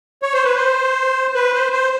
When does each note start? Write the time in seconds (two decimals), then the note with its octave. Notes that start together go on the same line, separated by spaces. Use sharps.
0.22 C#5
0.33 C5
0.44 B4
0.55 C5
1.35 B4
1.54 C5
1.72 C5